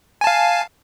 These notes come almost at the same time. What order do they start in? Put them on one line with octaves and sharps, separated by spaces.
G#5 A5 F5